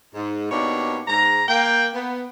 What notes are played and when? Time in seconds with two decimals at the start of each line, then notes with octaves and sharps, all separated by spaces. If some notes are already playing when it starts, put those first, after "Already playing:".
0.14 G#2
0.51 B2 A#3 D4 D#4 G4 C#5
1.08 G#2 A#5
1.48 A#3 G5
1.94 B3